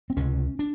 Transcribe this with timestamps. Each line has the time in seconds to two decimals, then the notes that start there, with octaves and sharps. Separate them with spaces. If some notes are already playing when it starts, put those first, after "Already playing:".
0.10 C4
0.17 C#2 C3 C#4
0.59 D4